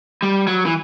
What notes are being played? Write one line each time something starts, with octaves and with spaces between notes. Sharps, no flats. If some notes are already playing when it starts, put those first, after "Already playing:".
G3
F#3
E3